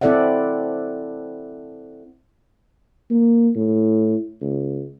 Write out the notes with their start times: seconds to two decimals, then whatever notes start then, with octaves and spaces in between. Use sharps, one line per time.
0.01 C4 E4 A4 D5 E5 F#5
3.11 A#3
3.55 A2
4.42 C#2